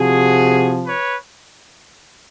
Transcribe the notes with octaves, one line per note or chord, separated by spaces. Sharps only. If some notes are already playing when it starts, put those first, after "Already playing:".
Already playing: C3 F3 F#4 G#4
B4 C#5